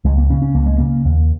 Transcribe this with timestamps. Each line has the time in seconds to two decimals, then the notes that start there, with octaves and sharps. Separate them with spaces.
0.05 C#2 G#3
0.18 A#3
0.30 C#3 C#4
0.42 C#4
0.55 C#2 A#3
0.66 G#3
0.78 C#3 A#3
1.05 D#2